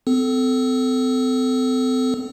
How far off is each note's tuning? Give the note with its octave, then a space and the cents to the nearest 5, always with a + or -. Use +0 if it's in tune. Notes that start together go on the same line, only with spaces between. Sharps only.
C4 -40 A4 -5